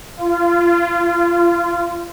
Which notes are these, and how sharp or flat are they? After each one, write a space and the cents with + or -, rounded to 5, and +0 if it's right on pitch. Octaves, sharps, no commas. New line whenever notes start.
F4 -25